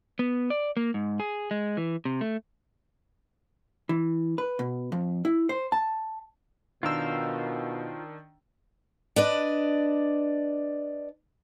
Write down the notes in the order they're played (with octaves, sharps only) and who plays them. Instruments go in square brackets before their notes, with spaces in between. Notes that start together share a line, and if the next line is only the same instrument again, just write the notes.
[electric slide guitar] B3
D5
A#3
G#2
G#4
G#3
E3
C3
A3
[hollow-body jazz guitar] E3
B4
B2
F2
E4
C5
A5
[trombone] B2 [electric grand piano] D#3 D4 E6 [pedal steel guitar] F4 A#4 C5
[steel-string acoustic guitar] D4 B4 D5 D#5